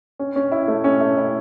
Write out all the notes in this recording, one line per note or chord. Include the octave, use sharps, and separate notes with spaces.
C#4
C#4
E4
A3
C#4
A3
E4